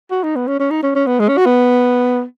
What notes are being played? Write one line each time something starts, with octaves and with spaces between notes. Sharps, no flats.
F#4
D#4
B3
C#4
C#4
D#4
C#4
C#4
B3
G#3
C#4
F#4
B3